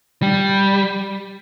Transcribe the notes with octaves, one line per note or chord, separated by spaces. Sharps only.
G3